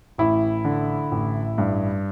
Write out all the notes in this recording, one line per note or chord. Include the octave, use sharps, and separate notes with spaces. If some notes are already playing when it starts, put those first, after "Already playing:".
A1 E4
D3
A1
G2